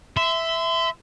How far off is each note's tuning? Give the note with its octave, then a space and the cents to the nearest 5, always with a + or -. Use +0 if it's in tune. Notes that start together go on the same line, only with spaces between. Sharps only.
E5 +0 C6 -35